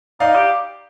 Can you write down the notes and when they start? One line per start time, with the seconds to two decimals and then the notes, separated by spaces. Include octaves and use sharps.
0.20 D#4 D5 F5
0.36 G4